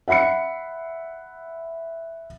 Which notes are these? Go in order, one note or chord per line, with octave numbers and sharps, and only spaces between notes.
E5 F#5 B5 C7 C#7